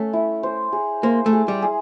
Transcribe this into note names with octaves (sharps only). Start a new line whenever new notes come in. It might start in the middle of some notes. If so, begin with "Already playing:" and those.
Already playing: A3 C#4
E4
C5
G#4
A#3 C5
A3
G#4
G3
G#4